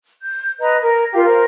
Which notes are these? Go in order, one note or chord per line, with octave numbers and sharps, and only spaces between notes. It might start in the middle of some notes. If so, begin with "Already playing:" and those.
G6
B4 D#5 A#5
A#4 G#6
F4 G4 A#4 F5
A#4 C5